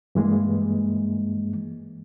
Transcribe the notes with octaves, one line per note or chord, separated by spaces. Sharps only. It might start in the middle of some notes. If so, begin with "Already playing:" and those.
G2 E3 G#3 A#3